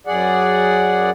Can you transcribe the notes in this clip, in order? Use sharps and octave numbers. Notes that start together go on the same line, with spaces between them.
F#2 G#4 D5 F#5